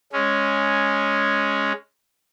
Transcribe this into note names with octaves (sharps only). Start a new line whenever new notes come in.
G#3 C#4